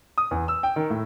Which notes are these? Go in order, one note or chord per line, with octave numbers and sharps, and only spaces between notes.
D#6
E2
E6
G5
D#3
A2